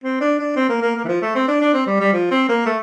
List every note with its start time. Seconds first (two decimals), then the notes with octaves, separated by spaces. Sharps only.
0.04 C4
0.21 D4
0.39 D4
0.56 C4
0.69 A#3
0.82 A#3
0.96 A#3
1.04 E3
1.08 F3
1.22 A3
1.35 C4
1.48 D4
1.61 D4
1.74 C4
1.87 G3
2.00 G3
2.13 F3
2.31 C4
2.49 A#3
2.66 A3